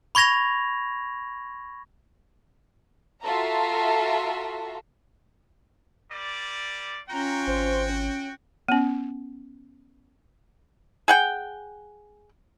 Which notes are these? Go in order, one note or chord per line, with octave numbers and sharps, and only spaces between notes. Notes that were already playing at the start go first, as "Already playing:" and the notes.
B5 C#6 G#6 A#6 F7
F4 F#4 A4 E5 A5 A#5
G3 A#3 D5
C#4 F4 F#4 G5 A#5
G#1 C5
C#4
B3 C#4
G#4 F#5 G5